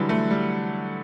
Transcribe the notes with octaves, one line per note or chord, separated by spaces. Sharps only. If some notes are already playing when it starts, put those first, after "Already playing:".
Already playing: D3 E3 F#3 G3
A3
G3